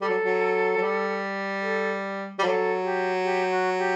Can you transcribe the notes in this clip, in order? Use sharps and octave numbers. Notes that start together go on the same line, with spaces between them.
G3 A4
F#3
F#3
F#3
G3
A4
G3
F#3 A4
G4
G4
F#4
G4